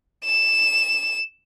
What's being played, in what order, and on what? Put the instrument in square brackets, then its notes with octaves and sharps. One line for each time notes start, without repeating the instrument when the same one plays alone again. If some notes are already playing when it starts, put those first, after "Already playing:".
[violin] E7